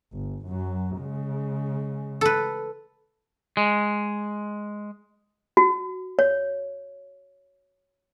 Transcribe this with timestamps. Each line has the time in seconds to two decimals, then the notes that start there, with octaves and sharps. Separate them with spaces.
0.13 G1
0.46 F#2 F#3
0.99 C#3 G#3
2.21 A4 B4
3.57 G#3
5.57 F#4
6.19 C#5